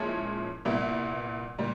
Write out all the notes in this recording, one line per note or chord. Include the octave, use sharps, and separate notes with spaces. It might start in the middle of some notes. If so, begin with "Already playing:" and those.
Already playing: A#2 F3 G#3 C#4 E4
C2 A#2 G3 B3 E4
A#2 G3